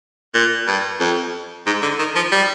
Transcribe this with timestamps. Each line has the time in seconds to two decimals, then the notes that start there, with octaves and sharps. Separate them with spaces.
0.34 A#2
0.67 G2
1.00 F2
1.66 G#2
1.82 D3
1.99 D#3
2.15 F3
2.32 G3